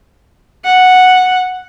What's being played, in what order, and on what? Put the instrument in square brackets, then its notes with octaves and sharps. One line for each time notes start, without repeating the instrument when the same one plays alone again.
[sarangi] F#5